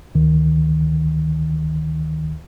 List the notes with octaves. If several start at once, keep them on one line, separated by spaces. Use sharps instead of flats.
D2 D#3